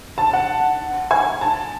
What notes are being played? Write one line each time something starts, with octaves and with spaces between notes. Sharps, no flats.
A5
F#5
G#5
A5